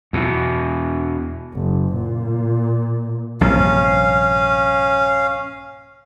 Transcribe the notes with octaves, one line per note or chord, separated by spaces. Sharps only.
E2 B2
F#1
A#2
A#1 G2 C3 C#4 F5